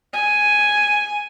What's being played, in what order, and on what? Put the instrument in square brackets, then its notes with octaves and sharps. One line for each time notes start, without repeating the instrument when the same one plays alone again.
[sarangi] G#5